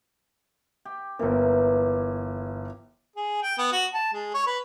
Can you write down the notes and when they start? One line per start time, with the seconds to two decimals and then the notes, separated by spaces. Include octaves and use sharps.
0.85 G4
1.19 G1 E3 A#3 A#4
3.16 G#4
3.42 G5
3.58 B3
3.72 F#4
3.94 A5
4.13 G#3
4.34 C#5
4.47 B4